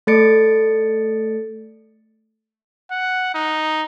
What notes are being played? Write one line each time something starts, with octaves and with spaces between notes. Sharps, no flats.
A3 A4 D5 A6 C#7 D7
F#5
D#4